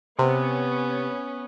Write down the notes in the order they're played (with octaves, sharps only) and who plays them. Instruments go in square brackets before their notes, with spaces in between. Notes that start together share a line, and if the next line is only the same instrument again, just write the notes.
[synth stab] C3 [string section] B3 C#4